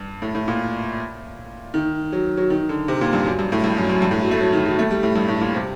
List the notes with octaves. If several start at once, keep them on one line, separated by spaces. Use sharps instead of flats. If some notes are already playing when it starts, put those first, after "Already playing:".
Already playing: G2
A2
A2
A#2
D#3
F#3
F#3
D#3
D3
C3
A#2
G2
F#2
G2
A2
G2
F#2
F#2
G2
A2
F#3
A3
F#3
D#3
F#3
A3
G3
A2
G2
A2
A#2
C3